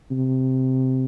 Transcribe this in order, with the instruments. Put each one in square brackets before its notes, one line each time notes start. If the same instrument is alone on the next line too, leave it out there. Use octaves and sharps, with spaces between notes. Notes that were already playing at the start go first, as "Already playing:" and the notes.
[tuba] C3